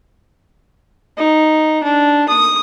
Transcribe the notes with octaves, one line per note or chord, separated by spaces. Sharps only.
D#4
D4
D#6